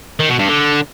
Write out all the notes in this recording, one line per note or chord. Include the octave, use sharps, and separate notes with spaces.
D#3
B2
G2
D3